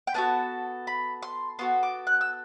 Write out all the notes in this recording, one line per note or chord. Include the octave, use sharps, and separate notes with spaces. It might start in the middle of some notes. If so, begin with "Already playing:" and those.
G5
B3 D4 F#4 A4 A5
B5
C6
B3 F#4 A4 C6
D6
F#6
E6